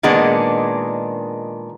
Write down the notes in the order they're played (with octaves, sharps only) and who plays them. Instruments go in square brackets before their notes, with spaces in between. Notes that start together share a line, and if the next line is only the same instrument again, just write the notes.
[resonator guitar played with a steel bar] A#2 D#3 G#3 B3 D4